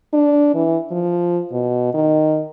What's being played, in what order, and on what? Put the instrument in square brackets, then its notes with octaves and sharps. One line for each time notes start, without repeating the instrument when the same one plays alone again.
[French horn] D4
E3
F3
B2
D#3